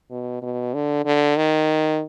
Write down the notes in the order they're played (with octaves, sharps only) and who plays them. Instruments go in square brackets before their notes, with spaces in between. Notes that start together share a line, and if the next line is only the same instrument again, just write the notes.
[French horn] B2
B2
D3
D3
D#3